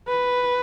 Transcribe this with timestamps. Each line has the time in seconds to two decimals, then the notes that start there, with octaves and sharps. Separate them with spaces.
0.08 B4